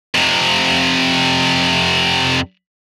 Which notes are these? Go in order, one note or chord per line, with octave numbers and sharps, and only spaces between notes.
F2 C3